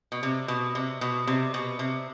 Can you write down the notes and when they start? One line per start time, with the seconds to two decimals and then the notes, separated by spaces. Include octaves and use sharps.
0.12 B2
0.23 C3
0.48 B2
0.75 C3
1.01 B2
1.27 C3
1.54 B2
1.79 C3